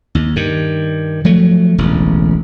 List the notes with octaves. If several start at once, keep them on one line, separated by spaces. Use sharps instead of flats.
D#2
G2 D#3
F3 F#3 A3
E1 A1 D2